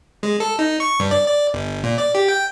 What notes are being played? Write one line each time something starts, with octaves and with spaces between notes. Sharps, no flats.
G#3
A4
D#4
C#6
G2
D5
D5
G1
A#2
D5
G4
G5